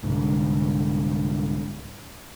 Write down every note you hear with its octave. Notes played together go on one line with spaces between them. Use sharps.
C2 G#2 D3